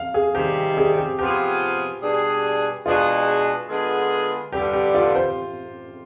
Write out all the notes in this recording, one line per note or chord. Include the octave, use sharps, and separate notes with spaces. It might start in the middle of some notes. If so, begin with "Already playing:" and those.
Already playing: F5
G#4
C3 D#3 G3 G4
G#4
G4
C3 F3 B3 F4 G4 G#4
B2 G3 D4 G#4
B2 G#3 D4 F4 G#4
D3 G#3 B3 F4 G#4
G2 D3 G3 G4
G4
F4
C5